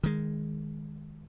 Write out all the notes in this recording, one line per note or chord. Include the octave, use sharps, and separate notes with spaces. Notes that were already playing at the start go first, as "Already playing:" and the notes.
D#3 G#3